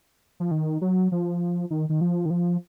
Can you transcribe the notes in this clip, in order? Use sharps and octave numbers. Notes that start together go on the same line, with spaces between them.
F3
D#3
F#3
F3
D#3
D#3
F3
D#3
F3